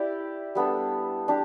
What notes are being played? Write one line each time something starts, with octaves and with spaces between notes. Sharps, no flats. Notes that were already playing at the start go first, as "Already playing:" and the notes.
Already playing: E4 G4 D5
G3 B3 D4 A4
D4 G4